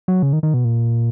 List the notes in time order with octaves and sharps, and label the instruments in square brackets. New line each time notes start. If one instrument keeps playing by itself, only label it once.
[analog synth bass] F#3
C#3
D#3
D#3
B2
A#2